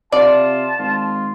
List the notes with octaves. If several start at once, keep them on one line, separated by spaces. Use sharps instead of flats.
C3 F4 D5 A5
G#1 F4